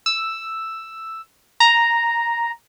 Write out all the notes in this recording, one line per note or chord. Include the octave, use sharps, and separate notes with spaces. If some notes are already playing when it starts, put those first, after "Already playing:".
E6
A#5